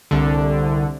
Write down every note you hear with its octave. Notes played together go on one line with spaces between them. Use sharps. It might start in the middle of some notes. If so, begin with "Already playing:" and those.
C2 D3